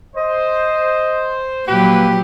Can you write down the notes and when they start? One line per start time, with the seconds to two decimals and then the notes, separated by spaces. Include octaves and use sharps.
0.16 C5 D#5
1.68 A#2 F3 F#3 A#3 G4 B4